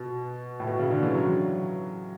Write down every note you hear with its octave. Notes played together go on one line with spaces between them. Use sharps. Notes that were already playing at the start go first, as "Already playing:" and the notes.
Already playing: B2
A2
B2
C#3
D3
E3
F#3